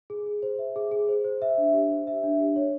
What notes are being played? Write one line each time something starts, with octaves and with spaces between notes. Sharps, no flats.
G#4
G#4
C5
E5
G#4
G#4
C5
C5
E5
D4
G4
C5
E5
D4
G4
C#5